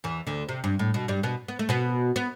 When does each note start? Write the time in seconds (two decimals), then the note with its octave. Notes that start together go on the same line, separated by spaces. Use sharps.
0.04 E2 E3
0.27 D2 D3
0.49 C3
0.64 G2
0.79 A2
0.94 B2
1.08 G2 G3
1.23 B2 B3
1.48 B3
1.59 A3
1.69 B2 B3
2.16 B3